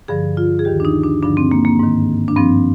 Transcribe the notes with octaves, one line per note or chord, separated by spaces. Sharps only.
G2 D3 F3 G#4
F4
G#4
D#2 D#3 G4
D4
D#4
D4
G2 D3 F3 D4
C4
A#3
A#3
G#2 D#3
D4
G2 F3 C4